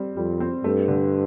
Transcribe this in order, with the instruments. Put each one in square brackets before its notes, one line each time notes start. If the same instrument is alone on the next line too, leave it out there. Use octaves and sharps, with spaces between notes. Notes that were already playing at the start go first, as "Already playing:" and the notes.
Already playing: [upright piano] G3 C4
[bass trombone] F2 [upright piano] G3
[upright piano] C4
[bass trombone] G2 [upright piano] A3
[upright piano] D3